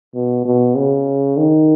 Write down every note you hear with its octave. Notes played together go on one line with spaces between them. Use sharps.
B2
B2
C#3
D#3